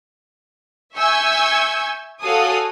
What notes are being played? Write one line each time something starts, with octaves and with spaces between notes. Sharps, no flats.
E5 G#5 C#6 E6 G6 G#6
F#4 A4 C#5 F5 G#5 D#6